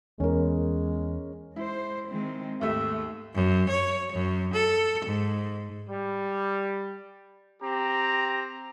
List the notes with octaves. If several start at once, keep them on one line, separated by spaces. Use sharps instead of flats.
E2 G#3 C#4 A#4
G#3 E4 C5
D#3 G#3 C4
D#2 G#2 A3 A#3 E5
F#2
C#5
F#2
A4
G#2
G3
C4 G4 A#5